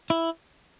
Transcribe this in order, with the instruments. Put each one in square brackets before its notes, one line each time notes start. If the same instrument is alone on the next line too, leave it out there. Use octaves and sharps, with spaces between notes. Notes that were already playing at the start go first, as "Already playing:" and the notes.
[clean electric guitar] E4